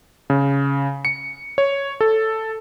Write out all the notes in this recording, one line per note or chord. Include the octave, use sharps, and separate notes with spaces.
C#3
C#7
C#5
A4